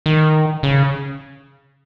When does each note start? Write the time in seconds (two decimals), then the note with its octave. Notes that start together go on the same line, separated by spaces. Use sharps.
0.06 D#3
0.63 C#3